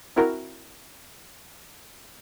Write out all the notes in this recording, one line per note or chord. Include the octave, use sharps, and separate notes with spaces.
C4 E4 F#4 A#4